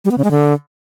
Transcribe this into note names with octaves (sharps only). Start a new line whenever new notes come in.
G3
B3
C#3
G#3
D3